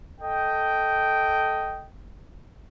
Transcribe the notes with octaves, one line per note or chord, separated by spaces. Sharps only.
A4 D#5 G5